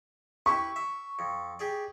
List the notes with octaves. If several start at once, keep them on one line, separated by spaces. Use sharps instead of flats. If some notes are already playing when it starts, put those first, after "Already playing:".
E4 G4 B4 C#6
E5
F2
G4 G#4 D5